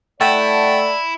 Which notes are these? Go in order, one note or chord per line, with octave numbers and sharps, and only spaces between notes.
A3 E4 D5 F#5 G5 A5